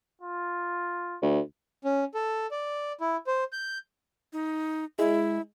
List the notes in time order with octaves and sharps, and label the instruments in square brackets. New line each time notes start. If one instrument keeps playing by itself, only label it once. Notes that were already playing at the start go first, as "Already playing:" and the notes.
[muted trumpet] F4
[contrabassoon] D2
[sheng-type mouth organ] C#4
A4
D5
E4
C5
G6
[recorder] D#4
[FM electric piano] G#3 [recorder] E4